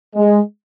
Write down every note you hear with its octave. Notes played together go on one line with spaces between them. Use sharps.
G#3